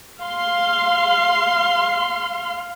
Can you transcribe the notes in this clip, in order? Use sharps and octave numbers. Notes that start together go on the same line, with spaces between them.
F5 C6